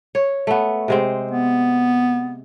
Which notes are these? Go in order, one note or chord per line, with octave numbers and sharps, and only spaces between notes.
C#5
A3 B3
C3 G#3 C4
B3